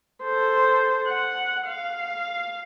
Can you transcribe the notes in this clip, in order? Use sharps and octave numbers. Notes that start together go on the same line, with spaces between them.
A4 C5
F#5
F5